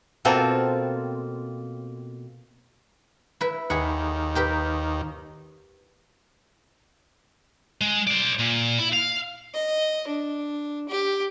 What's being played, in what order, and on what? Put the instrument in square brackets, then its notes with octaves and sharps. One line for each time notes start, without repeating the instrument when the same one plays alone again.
[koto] B2 A#3 C4 F4 A4
[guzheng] E4 B4
[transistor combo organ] D#2 [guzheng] G#4 B4 F#5
[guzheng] G4 A#4 B4
[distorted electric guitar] G#3
C5 D5
A#2
E4
F5
[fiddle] D#5
D4
G4